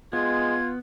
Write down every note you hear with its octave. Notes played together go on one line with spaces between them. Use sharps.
G#3 B3 F4 G#6